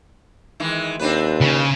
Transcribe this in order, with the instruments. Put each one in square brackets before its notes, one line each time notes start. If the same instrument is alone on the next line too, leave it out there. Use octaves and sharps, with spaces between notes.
[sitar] D#3 E3 G#3
[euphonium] D#2 [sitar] C4 D4 B4
[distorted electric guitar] C#3